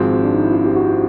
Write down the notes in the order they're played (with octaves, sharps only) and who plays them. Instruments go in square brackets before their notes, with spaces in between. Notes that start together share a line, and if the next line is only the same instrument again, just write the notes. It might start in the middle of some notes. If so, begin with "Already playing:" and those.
Already playing: [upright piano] G#1 G#2 F3 G#3 C4 [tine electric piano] F#4
[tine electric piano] D4
D#4
E4
F4
G4
F#4